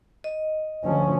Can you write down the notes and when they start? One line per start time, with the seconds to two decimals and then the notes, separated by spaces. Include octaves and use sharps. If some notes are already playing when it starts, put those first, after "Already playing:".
0.24 D#5
0.84 D2 F3 C#4